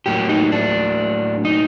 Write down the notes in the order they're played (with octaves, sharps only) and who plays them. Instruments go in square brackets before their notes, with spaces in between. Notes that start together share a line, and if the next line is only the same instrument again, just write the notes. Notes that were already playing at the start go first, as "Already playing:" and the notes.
[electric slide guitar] A2 F#3 A#3 G4
D#4
D4
D#4